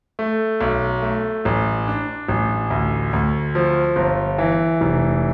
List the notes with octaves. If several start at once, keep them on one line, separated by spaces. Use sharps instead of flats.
A3
B1
A3
A1
D4
A1
D2
D2
F3
G1
E3
F1